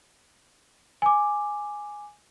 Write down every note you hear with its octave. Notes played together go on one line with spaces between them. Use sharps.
G#5 D6